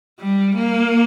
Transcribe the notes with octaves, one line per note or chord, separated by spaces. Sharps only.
G3
A#3